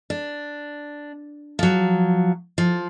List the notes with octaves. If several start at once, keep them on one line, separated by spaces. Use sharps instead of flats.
D4
F3 F#3
F3